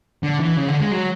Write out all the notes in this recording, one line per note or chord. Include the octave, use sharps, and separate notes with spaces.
D3
E3
C#3
D3
G#3
F#3